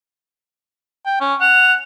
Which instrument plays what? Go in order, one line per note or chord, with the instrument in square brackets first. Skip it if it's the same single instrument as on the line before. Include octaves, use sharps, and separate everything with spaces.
[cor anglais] G5
C#4
[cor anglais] F#5 [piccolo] F7